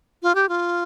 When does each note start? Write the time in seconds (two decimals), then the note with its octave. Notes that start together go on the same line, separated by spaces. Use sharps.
0.22 F4
0.35 G4
0.49 F4